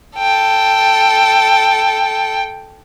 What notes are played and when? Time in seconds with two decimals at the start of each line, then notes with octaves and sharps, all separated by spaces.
0.17 A4 G5